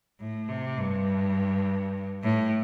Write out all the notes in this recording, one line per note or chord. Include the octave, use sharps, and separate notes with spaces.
A2
C3
G2
A2